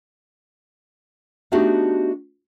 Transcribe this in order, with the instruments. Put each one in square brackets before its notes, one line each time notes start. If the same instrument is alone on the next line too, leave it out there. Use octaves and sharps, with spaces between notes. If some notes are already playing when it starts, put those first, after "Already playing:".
[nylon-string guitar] A3 B3 D4 D#4 F#4 G4